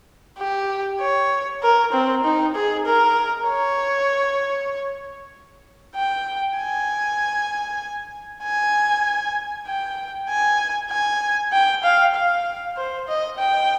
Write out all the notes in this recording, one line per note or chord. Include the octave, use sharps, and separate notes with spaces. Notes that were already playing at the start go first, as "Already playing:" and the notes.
G4
C#5
A#4
C4
D#4
G#4
A#4
C#5
G5
G#5
G#5
G5
G#5
G#5
G5
F5
F5
C5
D#5
G5